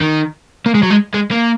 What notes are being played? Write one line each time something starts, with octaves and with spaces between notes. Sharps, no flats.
D#3
A#3
G#3
F#3
G#3
G#3
A#3